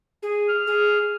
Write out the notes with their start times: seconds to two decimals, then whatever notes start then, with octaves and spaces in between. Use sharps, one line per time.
0.23 G#4
0.49 F6
0.67 G#4